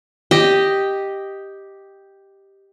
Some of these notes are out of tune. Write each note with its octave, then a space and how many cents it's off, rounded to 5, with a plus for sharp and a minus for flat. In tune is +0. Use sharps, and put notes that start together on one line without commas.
G4 +0 D#5 +0